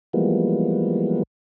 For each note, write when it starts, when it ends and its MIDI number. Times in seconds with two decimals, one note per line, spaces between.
0.13 1.23 52
0.13 1.23 53
0.13 1.23 55
0.13 1.23 56
0.13 1.23 58
0.13 1.23 59